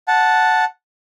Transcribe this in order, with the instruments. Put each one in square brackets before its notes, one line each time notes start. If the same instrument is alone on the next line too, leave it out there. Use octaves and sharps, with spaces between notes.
[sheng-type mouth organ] F#5 A5